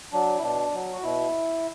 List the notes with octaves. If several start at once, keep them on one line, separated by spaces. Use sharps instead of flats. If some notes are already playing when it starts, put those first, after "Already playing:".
F#3 D4
E4
B2 D4
F#3
F#4
B2 E4